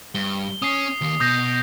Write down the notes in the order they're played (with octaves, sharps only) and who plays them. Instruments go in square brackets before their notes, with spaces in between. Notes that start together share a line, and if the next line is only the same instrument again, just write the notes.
[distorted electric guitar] G2 [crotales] G7
[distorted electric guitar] C#4 [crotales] D#6 C7
[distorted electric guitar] D#2 D#3
[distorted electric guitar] B2 [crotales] D#6 G6 A#6